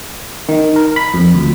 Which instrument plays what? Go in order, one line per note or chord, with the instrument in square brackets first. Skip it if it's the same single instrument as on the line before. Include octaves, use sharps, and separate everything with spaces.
[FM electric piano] D#3
A#4
B5
F2
D2